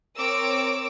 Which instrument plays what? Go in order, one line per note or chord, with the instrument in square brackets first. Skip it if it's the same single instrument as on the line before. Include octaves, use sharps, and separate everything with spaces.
[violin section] C4 A#4 C#5 D6 E6